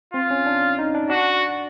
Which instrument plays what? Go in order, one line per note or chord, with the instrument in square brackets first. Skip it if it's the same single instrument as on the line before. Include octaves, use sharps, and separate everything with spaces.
[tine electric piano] C4 [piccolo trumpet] F4
[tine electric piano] C#4
D4
D#4
D4
[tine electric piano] D4 [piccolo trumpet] F#4